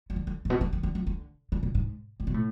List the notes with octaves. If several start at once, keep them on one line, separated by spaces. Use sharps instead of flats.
F3
D3
D3
A2
B2
C#3
D3
D3
F3
D3
C#3
B2
G#2
A2
B2
A2